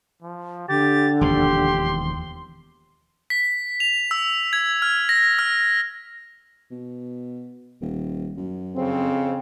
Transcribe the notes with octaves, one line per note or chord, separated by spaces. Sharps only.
F3
D3 G4 A6
E1 D#2 F3 G4 C6
B6
F7
E6
G#6
F6
A#6
F6
B2
D#1
F#2
F2 C#3 C4